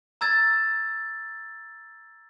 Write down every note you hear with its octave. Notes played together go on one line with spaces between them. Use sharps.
A#5 E6 G#6 A6